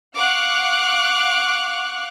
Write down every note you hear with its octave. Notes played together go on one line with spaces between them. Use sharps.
F5 F#5 C#6 D6 F6 F#6